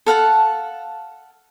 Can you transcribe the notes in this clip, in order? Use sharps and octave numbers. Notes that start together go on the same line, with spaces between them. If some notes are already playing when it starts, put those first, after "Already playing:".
A4 F5 F#5 A5